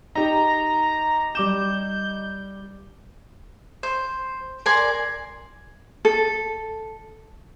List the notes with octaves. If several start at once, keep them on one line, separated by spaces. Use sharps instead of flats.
D#4 G4 A#5
G3 D6 G6 E7
C5
A#4 D5 G#5 C6
A4